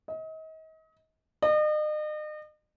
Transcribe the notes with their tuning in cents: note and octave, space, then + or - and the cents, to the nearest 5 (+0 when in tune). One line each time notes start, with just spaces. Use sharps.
D#5 +35
D#5 -40